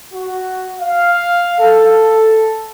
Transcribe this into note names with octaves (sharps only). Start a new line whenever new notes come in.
F#4
F5
A4